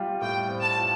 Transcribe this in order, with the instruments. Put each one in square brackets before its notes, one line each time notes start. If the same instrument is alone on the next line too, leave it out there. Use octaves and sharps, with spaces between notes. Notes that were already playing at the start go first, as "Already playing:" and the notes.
Already playing: [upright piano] G3 F4
[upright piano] A2 [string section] G5
[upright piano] C4
[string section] A5
[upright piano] F4